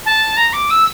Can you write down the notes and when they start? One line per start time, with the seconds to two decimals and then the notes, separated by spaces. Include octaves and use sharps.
0.06 A5
0.37 A#5
0.53 D6
0.70 E6